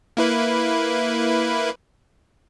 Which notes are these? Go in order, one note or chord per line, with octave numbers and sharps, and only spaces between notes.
A#3 E4 B4